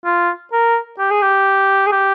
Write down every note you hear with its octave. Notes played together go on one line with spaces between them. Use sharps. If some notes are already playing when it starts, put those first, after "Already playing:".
F4
A#4
G4
G#4
G4
G#4
G4